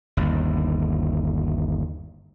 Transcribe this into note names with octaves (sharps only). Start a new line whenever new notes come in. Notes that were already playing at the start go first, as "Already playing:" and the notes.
G1 D#2